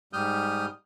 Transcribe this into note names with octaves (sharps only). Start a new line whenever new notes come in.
G#2 G3 D#6 F6 G6